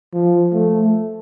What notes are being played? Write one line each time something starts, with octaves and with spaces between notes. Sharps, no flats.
F3
A3